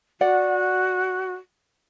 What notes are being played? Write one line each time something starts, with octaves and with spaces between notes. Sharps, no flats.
F#4 D5 F#5